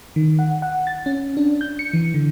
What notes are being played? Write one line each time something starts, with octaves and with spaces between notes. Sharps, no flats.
D#3
F#5
F#5
A6
C#4
D4
G6
C#7
E3
D3